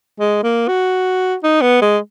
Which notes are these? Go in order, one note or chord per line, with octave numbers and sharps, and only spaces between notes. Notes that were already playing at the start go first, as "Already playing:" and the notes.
G#3
A#3
F#4
D#4
B3
G#3